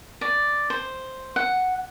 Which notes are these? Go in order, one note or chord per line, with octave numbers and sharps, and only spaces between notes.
D5
C5
F#5